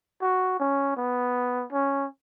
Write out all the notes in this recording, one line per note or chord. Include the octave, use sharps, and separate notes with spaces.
F#4
C#4
B3
C#4